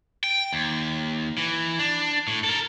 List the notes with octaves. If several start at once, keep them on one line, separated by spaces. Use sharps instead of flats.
G5
D#2
E3
D4
A2
A4 A#4